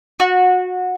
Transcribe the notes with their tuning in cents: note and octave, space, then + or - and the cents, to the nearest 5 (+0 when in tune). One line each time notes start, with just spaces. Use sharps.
F#4 -20